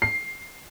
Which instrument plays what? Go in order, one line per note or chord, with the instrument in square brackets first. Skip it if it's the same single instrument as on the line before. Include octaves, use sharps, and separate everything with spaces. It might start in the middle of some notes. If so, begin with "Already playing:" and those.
[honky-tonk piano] C7